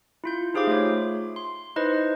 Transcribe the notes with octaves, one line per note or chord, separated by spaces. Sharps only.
E4 F4 G6
D#4 G4 G#4 C5 F5 D6
A3 F4 C#5
C6
D#4 E4 B4 C5 D#5